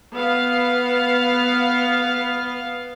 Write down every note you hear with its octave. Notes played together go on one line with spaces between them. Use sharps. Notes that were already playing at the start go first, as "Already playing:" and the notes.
B3 F5